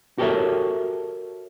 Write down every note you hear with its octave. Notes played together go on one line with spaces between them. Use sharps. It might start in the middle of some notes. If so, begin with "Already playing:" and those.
F#4 G4 A4 A#4 C#5 E5